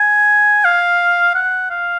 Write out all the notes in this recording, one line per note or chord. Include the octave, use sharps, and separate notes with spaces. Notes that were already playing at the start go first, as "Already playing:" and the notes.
Already playing: G#5
F5
F#5
F5